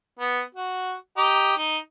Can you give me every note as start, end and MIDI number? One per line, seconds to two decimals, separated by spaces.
0.19 0.41 59
0.55 0.94 66
1.17 1.56 67
1.17 1.56 75
1.17 1.56 82
1.57 1.77 63